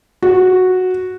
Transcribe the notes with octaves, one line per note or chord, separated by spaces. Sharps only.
F#4